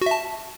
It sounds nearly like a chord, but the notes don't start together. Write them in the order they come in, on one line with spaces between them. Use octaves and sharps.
F#4 E5 A5